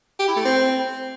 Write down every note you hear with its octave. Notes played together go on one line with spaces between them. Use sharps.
G4
E4
A3
C4